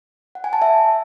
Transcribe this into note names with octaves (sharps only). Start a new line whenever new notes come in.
F#5
G#5
A5
E5